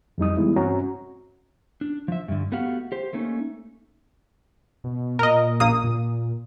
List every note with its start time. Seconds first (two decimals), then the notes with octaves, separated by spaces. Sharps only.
0.18 F2 G3 D#4 D#6
0.37 E3 G3 G#3 B3 E4
0.56 G2 C4 C#4 F#4 C#5 A#5
1.81 D4
2.08 F3 E5
2.28 G2 D3
2.52 A3 B3 F#4 G4 F5 F#5
2.92 G4 C5
3.13 A3 A#3 C#4 D#4
4.84 B2
5.19 A#2 A#4 D#5
5.60 A#1 A#3 D#6
5.84 A#2